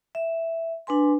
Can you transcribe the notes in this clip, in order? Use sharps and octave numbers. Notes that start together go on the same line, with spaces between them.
E5
D4 B4 G#5 C6